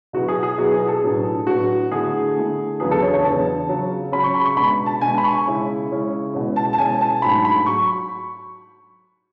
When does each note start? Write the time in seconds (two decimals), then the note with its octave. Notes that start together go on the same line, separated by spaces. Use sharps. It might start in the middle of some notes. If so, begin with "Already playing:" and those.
0.13 B2 F#3 B3 E4 F#4
0.28 G#4
0.43 G#4
0.58 B2 F#3 B3 E4 F#4
0.73 G#4
0.88 A4
1.03 A2 F#3 B3 D4
1.47 A2 F#3 B3 D4 F#4
1.91 D3 A3 E4 G#4
2.36 D3 A3 E4
2.80 E2 C#3 F#3 B3 D4 G#4
2.91 A4
3.02 C#5
3.13 C#5
3.23 E2 C#3 F#3 B3 D4 A5
3.68 C#3 F#3 C#4
4.12 C#3 F#3 C#4 B5
4.24 C#6
4.34 B5
4.45 C#6
4.56 B2 G#3 D4 B5
4.86 A5
5.01 B2 G#3 D4 G#5
5.18 B5
5.24 C#6
5.46 C#3 G#3 C#4 E4
5.89 C#3 G#3 C#4 E4
6.33 B2 G#3 C#4 E4
6.56 A5
6.73 A5
6.78 B2 G#3 C#4 E4 G#5
7.01 A5
7.22 G#2 F#3 A3 D4 B5
7.45 B5
7.66 F#3 C#6